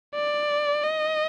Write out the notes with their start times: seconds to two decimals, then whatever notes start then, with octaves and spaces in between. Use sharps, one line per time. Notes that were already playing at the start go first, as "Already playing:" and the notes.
0.15 D5
0.83 D#5